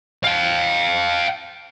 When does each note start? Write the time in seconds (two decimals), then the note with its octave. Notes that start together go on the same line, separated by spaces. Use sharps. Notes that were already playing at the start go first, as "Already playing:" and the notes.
0.24 F5 G5